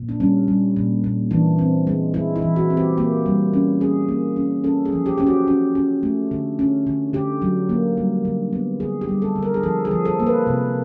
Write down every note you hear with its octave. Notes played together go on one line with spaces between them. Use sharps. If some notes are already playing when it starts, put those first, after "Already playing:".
Already playing: A#2
D4
G3 C#4
G3
A#2
A#2
E3 D4
C4
G#3
G#3 E4
E4
E3
F#4
C4
G4
A#3 G4
G3
C#4
C#4 G#4
A#3
C#4
C#4 A4
G#4
F3
G4
C#4 G4
F#4
C#4
C#4
A3
D3
C#4
D3
D3 G4
F#3
A#3
G3
D3
B3
D3 G#4
G4
G3
A4
D3
A#4
G#4
F3 A4
G#4
F3
A4
A#3
B4
C3